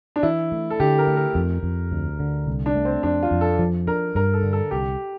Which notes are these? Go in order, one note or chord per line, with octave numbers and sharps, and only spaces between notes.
D4
E3 E4
A3
A4
D3 G4
A#4
A3
A#4
F2
F2
D2
D3
C2
D4
A3
C4
F2 D4
F4
F2
A4
F3
D4 A#4
G2 A#4
A4
D3
A4
C2 G4